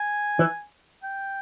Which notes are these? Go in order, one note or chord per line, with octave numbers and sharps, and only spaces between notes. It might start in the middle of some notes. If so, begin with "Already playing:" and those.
Already playing: G#5
E3
G5